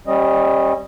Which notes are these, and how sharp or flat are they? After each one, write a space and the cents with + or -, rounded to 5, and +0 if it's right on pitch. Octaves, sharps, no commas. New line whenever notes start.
G3 +0 C#4 -35 D#5 +0